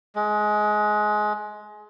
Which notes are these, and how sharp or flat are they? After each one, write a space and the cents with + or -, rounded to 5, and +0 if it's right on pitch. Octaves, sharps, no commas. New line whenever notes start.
G#3 +20